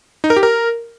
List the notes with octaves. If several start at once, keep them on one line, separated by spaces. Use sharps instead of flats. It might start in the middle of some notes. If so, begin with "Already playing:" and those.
D#4
A#4
G4
A#4